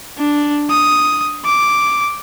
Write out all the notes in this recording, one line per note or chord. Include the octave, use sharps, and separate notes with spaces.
D4
D#6
D6